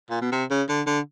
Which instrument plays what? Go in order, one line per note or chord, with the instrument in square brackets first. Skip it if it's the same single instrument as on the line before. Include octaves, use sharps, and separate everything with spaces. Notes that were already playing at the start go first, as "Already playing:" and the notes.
[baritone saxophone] A#2
B2
C3
C#3
D3
D3